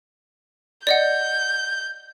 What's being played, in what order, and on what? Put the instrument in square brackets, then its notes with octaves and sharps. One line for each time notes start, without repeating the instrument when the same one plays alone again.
[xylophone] D5 D#5 F#5 [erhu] G6